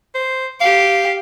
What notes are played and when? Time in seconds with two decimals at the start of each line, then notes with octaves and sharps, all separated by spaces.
0.15 C5
0.61 G4 F5